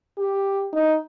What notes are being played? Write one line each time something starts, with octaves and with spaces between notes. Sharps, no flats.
G4
D#4